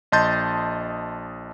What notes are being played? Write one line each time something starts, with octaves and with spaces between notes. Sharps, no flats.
A#1 D#5 A5 C6 G6 A6